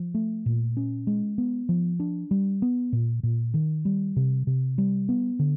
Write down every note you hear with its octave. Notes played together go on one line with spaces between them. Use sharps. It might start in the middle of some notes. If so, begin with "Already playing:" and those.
Already playing: F3
A3
A#2
C#4
G#3
B3
F3
D4
G3
B3
A#2
A#2
D#3
G3
C3
C3
G3
B3
D3